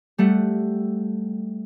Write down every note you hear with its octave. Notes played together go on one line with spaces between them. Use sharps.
G3 A3 F#5